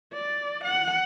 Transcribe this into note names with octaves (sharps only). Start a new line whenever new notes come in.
D5
F#5